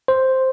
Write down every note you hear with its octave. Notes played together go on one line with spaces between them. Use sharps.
C5